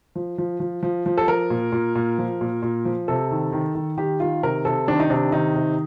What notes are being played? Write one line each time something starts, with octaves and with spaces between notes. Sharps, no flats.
F3
F3
F3
F3
F3
A4
F3 A#4
A#2
A#2
A#2
F3
A#2
A#2
F3
C3 A4
D#3
D#3
D#3
D#3 G4
D#3 F4
C3 A#4
C3 A4
D#3 D4
D#4
C3 D4
D#3 D#4
C3